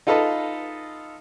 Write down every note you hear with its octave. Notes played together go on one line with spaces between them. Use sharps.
D#4 F4 A4 B4 D#5